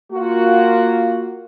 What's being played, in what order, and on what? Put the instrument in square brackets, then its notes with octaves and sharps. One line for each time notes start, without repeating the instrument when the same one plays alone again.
[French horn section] A#3 F4 F#4